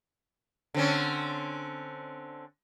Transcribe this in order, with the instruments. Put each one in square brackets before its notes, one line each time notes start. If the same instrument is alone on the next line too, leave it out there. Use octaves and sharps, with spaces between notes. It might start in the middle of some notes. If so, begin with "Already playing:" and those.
[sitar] D3 C4 C#4